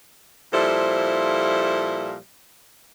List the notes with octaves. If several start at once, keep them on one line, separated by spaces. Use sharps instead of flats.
A#2 F3 G3 E4 A4 C5